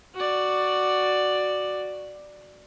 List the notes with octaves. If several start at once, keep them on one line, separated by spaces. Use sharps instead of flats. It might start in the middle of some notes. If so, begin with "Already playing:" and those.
F#4 D5